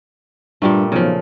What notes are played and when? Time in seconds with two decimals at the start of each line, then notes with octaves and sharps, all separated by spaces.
0.62 G2 A#2 G3 A3
0.92 B1 C#3 F3